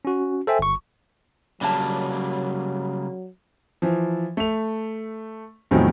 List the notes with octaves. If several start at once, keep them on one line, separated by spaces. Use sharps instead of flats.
C#4 F#4
A4 C5 E5 G5 G#5
G1 C#6
C#3 F#3 G3 A#3 D4 A5
E3 F3
A3 F7
E2 A2 C3 D#3 F3 F#3